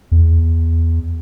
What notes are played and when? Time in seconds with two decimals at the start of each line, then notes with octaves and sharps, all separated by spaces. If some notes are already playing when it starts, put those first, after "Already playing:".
0.11 E2